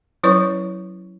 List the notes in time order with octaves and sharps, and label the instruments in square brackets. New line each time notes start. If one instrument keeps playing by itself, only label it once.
[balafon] F#3 C#4 E4 B4 C#5 C#6